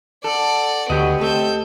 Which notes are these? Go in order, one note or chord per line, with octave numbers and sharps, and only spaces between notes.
A4 D5 F#5
D2 F#3 B3 G4 D#5
A3 C4 A4 G6